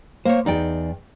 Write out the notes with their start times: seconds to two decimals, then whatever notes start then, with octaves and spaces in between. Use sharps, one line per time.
0.25 A#3 C5 C#5
0.46 E2 D#4 D5 G5